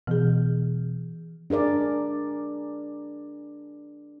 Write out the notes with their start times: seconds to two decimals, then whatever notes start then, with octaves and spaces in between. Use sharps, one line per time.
0.07 B2 E3 G#4
1.50 D4 G#4 A#4 D5